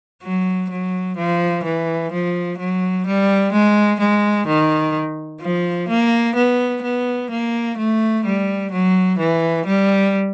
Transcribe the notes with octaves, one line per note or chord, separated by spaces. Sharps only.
F#3
F#3
F3
E3
F3
F#3
G3
G#3
G#3
D#3
F3
A#3
B3
B3
A#3
A3
G3
F#3
E3
G3